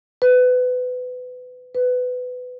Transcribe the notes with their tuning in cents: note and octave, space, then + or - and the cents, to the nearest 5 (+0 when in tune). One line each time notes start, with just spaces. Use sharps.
B4 +25
B4 +20